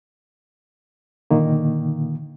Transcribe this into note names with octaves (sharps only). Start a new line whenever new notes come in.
A#2 D3 D#3 A#3